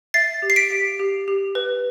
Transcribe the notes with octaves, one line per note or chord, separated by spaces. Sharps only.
E5 A6 C7
G4
C7
B6 D7
G4
G4
G4
B4